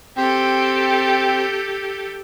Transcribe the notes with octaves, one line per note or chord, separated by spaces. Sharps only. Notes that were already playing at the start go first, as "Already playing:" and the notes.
C4 G4 A4